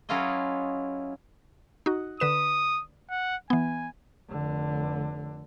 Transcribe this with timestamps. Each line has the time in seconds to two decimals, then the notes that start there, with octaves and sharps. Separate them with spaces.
0.09 F#3 C#4 E4 F4 G#4 D#5
1.86 D#4 F#4
2.20 D3 B4 D#6 E7
3.10 F#5
3.50 E3 B3 G#5
4.29 F1 D3